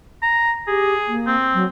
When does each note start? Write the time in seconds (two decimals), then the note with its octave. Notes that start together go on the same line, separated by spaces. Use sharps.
0.23 A#5
0.67 G4 G#4
1.07 A#3
1.27 C4
1.54 F#3